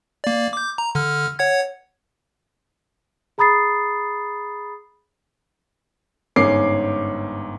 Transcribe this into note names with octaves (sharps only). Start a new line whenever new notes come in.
A#3 D5
D6 G6
A#5
D3 F6
C#5 F#5 G#6
G#4 A#5 B5 D#6 A6 C7
G1 G#2 C#4 D6 C7